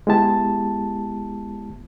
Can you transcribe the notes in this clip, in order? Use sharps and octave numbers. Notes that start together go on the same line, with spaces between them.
G#3 B3 E4 G4 A5